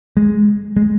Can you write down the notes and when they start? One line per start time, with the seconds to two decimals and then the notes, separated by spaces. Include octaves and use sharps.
0.17 G#3
0.77 G#3